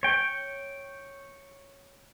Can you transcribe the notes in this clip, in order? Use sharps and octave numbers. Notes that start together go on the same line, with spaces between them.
C#5 G5